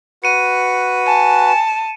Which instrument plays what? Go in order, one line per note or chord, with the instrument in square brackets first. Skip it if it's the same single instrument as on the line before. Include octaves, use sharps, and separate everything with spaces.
[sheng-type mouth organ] F#4 B4 [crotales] C#7 D#7
[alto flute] G#5 [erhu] A5